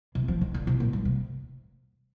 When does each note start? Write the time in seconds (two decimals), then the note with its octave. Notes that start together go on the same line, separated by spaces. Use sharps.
0.15 C3
0.28 F3
0.41 D#3
0.54 D3
0.67 C3
0.80 A#2
0.93 G2
1.05 C3